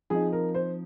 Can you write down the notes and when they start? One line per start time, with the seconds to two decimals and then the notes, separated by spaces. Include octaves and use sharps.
0.10 F3 C4 D#4 G#4
0.32 A#4
0.54 C5